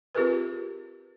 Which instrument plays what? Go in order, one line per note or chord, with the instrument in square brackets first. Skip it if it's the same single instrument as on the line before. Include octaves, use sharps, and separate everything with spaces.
[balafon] C4 F4 G4 G#4 A#4 B4